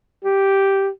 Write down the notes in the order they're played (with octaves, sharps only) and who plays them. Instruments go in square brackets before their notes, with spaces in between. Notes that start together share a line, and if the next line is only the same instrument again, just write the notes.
[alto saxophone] G4